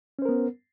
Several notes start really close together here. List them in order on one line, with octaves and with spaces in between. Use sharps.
C#4 C5 A#4 B3